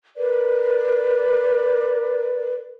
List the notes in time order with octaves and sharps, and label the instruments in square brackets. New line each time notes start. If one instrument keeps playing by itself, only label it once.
[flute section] A#4 B4 D5